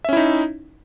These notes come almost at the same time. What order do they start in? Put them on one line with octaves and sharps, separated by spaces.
E5 C#4 E4 D#4